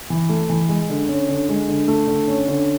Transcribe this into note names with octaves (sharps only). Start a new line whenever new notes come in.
E3
A3
E3
G#3
D3
C#4
D3
G#3
D3
A3
D3
C#4
D3